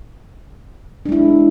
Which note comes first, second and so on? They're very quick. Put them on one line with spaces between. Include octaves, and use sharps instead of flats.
D4 G#3 E4